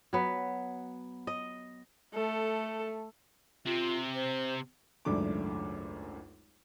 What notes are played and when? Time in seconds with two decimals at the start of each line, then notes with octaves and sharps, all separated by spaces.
0.13 F#3 B3
1.27 D#5
2.14 A3 A4
3.66 C3 C4 F4
4.15 C5
5.05 G#1 C#2 F#2 A3 D4 D6